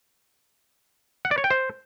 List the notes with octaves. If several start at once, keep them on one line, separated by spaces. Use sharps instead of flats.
F#5
D5
C#5
G5
C5